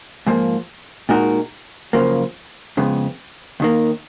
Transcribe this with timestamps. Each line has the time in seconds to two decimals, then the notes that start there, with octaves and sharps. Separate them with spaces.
0.27 G#2 F3 A#3
1.09 A#2 G#3 D#4 F#4 A#4
1.93 F#2 C#3 F3 A#3
2.77 F2 C#3 G#3 B3
3.60 D#2 D#3 A#3